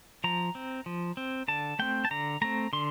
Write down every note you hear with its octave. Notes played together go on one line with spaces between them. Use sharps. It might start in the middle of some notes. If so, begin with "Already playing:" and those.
F3 A#5
C4
F3
C4
D3 A5
A3 C4 G5
A5
D3 A#5
A3 C4 A#5
D3 C6